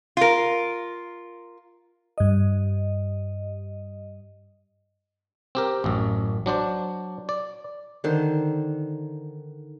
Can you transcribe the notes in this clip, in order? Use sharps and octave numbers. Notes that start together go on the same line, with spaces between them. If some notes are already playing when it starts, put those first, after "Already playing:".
F4 A#4
G2 D#5
C4 G4 A#4
A1 F#2
F#3 D4 C5 D5
D5
D3 D#3 C5